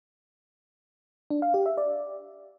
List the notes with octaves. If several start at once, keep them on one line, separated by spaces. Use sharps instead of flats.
D4
F5
G4
E5
D5